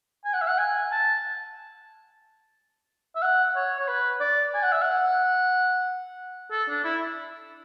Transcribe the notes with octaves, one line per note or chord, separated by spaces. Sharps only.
G#5
F#5
E5
F#5
G#5
A5
E5
F#5
C#5
C#5
B4
D5
G#5
F#5
E5
F#5
A4
D4
E4